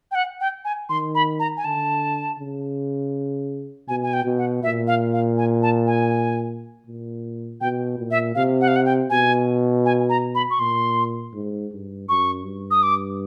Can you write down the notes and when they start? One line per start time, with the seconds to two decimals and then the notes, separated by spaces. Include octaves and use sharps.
0.11 G5
0.15 F#5
0.41 G5
0.65 G#5
0.89 D#3 C6
1.15 B5
1.39 A#5
1.57 G#5
1.64 D3 A5
2.39 C#3
3.88 B2 G#5
4.03 G#5
4.13 G5
4.25 B2
4.38 F#5
4.63 A#2 E5
4.87 F5
5.13 F5
5.38 G#5
5.62 A5
5.87 G#5
6.86 A#2
7.61 B2 G5
7.99 A#2
8.11 E5
8.35 C3 F5
8.61 F#5
8.68 F5
8.76 F#5
8.85 G5
9.10 B2 G#5
9.85 G#5
10.09 A#5
10.35 B5
10.50 C#6
10.59 A#2 C6
11.33 G#2
11.72 G2
12.09 F#2 C#6
12.45 G2
12.71 D#6
12.83 D6